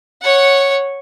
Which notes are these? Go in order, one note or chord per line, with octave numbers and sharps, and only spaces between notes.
C#5 F#5